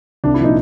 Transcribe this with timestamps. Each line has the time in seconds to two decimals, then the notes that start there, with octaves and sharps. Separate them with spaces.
0.24 C2 D4
0.34 E4
0.40 A#2 F3 D#4